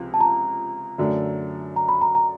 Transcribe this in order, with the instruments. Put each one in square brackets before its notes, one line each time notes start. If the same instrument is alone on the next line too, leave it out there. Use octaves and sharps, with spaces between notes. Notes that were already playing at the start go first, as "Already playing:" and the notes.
Already playing: [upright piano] C#2 C3 F3
[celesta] A5
A#5
[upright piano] F#2 D3 F#3 A3 D4
[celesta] A#5
B5
A#5
A#5